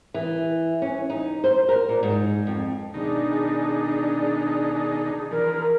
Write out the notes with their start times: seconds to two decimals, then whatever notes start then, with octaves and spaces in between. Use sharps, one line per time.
0.14 E3
0.82 C#4
1.10 D#4
1.44 C5
1.69 A#4
1.89 A#2
2.03 G#2
2.47 F2
2.94 B2 D#3 D4 D#4 G#4 D5
5.31 E3 F3 A#4